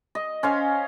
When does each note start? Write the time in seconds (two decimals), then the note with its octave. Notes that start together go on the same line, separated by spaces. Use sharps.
0.15 D#5
0.43 C#4 C5 F5